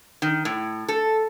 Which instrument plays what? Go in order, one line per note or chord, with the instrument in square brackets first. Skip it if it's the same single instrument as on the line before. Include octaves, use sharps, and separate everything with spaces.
[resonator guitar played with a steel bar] D#3
A2
A4